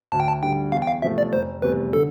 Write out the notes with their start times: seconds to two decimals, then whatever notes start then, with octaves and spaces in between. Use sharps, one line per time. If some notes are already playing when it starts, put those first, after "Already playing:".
0.12 D2 A5
0.20 G5
0.28 A5
0.42 D3 G3 G5
0.72 E2 F5
0.82 G5
0.87 F5
1.02 C3 F3 A3 E5
1.18 D5
1.33 F1 C5
1.62 E2 C3 G3 B4
1.93 D3 A4